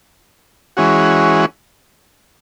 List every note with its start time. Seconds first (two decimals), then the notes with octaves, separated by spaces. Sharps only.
0.77 E3 G#3 C#4 F#4